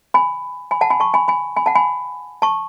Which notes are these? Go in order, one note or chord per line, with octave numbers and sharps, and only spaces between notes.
G#5 B5
G#5 B5
F#5 A5
G#5 B5
A5 C#6
G#5 B5
G#5 B5
G#5 B5
F#5 A5
G#5 B5
A5 C#6